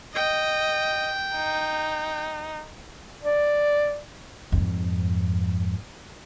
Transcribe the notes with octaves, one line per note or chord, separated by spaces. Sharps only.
D#5 G5
D#4
D5
F2 G#2